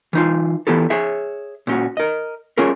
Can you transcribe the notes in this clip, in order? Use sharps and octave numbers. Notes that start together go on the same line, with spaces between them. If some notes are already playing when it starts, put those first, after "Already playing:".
E3 D#4 F4
E3 B3 E4 G4 A4
G#4 C#5 E5
A#2 C#4 F#4
A#4 D#5
C#4 F4 G#4 A#4